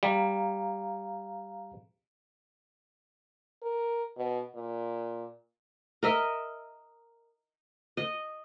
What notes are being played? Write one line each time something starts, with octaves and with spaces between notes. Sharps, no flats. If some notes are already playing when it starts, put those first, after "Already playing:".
G3 F5 A#5
A#4
B2
A#2
A#4 D#5 E5
D#5